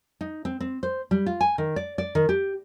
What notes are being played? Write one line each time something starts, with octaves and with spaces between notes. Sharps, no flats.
D#4
C4
C4
C5
G3
F4
G#5
D#3
D5
D5
D#3
G4